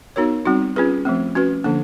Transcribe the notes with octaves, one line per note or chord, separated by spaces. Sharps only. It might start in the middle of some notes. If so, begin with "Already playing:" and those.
B3 D#4 F#4 A#4 C#5
G3 C4 D#4 F#4
C#4 F4 G#4 B4
F3 A3 C4
C#4 F#4 B4
D3 F3 A#3 D4